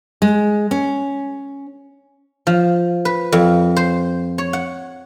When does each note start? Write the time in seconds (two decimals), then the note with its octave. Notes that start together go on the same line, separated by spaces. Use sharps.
0.22 G#3
0.71 C#4
2.47 F3
3.05 B4
3.32 F2
3.77 C5
4.38 C#5
4.53 F#5